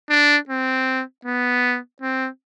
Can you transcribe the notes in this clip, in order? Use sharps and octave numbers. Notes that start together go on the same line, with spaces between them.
D4
C4
B3
C4